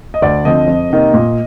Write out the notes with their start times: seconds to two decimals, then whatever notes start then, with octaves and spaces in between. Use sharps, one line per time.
0.14 D#5
0.22 D2 D5
0.45 D3 F3 C4 D#5
0.67 F2
0.90 C3 D#3 A#3
1.14 A#2